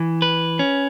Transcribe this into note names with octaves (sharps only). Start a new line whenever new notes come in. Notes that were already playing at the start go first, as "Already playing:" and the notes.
Already playing: E3
B4
C#4